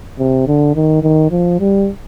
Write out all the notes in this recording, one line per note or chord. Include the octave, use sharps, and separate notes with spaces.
C3
D3
D#3
D#3
F3
G3